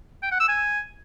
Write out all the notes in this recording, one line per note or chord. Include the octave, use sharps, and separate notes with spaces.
G5
F#5
E6
G#5